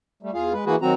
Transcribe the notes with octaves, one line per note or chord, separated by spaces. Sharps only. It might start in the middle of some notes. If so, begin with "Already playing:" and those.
G3 A3
E2 F4 G#4 F5
G#3 B4
E3 A#3 F#4 G#4 B4
D#3 F#3 C4 F#4 A#5